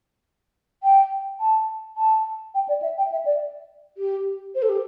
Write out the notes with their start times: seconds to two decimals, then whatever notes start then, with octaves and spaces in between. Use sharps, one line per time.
0.83 G5
1.40 A5
1.97 A5
2.54 G5
2.68 D5
2.82 E5
2.98 G5
3.12 E5
3.25 D5
3.98 G4
4.55 C5
4.62 A4
4.69 G4